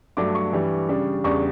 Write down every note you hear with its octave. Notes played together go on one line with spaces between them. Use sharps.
G2 F#3 A3 D4 D6
C#6
G2 E3 G3
C#3 G3 D4
E2 C#3 G3 D4 C#6